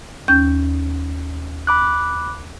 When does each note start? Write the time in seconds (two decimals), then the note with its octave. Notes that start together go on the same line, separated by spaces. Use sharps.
0.28 D#2 C#4 G6
1.67 B5 D6 F#6